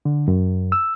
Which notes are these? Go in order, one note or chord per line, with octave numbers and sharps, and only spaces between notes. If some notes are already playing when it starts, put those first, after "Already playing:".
D3
F#2
E6